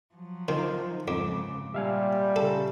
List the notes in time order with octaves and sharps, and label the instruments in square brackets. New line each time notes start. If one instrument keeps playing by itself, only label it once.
[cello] F3 F#3
[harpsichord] D#3 [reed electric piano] D#4 F4 C5
[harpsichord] F2 [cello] G#2 C#3 [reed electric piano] D6
[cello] A#2 [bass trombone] G3 [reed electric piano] E5 F5 G#5
[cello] A#2 C#3 [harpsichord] A4